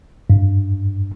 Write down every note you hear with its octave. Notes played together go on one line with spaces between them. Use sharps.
G2